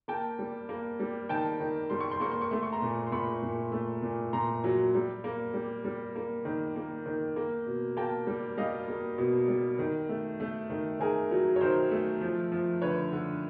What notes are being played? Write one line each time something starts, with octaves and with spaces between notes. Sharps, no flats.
A#3 G5 A5
G3
A#3
G3
D#3 G5 A5
D#3
G3 C6
C#6
C6
A#3 C#6
C6
C#6
A3 C6
C#6
A#5 C6
A#2
C6
A#2 B5 C#6
A#2
A3
A#2
A#2 A#5 C6
F#3
G3
A#3
G3
G3
A#3
D#3
A#3
D#3
A#3
B2
A#3 G5 A5
G3
G3 D#5 F5
A#3
B2
G3
D#3
A3
A3
D#3
D#3 G#4 A#4
F#3
C#5
D#3 A#4 C5
A3
F3
F3
D3 B4 C#5
D3